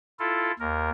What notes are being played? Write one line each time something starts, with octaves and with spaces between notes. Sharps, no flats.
E4 F4 A4
D#2 A#4